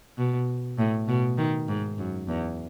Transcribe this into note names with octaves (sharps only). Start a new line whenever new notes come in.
B2
A2
B2
D#3
G#2
F#2
E2